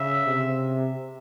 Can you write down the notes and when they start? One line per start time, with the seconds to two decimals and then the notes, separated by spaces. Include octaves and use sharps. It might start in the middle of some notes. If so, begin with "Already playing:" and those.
Already playing: C#3 E5
0.26 C3